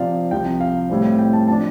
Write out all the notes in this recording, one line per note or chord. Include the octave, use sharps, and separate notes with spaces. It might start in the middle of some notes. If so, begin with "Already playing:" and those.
Already playing: C3 F3 C4 D5 F5
C2 C3 F3 G5
F5
A2 G3 C4
G5
A5
F3 D4 A5